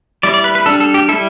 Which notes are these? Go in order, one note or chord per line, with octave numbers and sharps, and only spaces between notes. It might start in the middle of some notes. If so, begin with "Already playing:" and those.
G3 E4 D5
D5
B4
B4
G3 D4 A4
A4
G4
G3 E4 A4